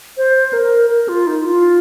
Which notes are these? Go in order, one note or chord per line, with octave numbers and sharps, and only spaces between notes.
C5
A#4
A#4
F4
D#4
F4